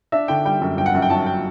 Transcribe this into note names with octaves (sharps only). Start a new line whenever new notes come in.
D4 E5
D3 G5
G3 G5
F#2
G1 G5
F#5
F#2
G5
F#3 A5
G5